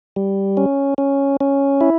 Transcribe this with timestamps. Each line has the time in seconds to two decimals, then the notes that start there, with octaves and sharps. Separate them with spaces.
0.16 G3
0.57 C#4
0.98 C#4
1.41 C#4
1.81 E4